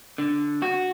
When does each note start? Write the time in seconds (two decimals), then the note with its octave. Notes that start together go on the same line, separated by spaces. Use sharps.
0.18 D3
0.62 F#4